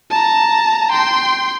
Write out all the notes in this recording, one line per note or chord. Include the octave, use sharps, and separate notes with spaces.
A5 A#5
G5 C6